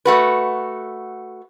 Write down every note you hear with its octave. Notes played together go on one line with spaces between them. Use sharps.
A3 F#4 B4